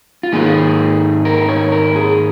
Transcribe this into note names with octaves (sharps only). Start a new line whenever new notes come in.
F4
G#2 D#3 A#3 G#4
A#4
C#5
A#4
G#4